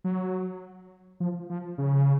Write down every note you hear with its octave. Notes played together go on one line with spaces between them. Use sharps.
F#3
F3
F3
C#3